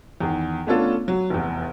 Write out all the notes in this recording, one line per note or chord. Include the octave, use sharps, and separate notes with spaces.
E2 D#3
A3 B3 C#4 D4 F4 A4
F#3
F1 E2